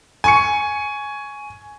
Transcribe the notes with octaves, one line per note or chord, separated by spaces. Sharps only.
G#5 C#6 C#7